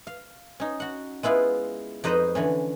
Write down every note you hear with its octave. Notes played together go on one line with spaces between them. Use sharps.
F5
C#4 D#4
F#4 F#5
G#3 B3 E4 F4 B4
F2 D#4 B4 C5 D#5 A#5
D3 E3 C#4